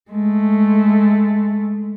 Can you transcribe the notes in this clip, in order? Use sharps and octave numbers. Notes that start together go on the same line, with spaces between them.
G#3 A3